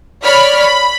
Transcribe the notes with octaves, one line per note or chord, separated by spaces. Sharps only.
C#5 D5 B5 F6 B6
B5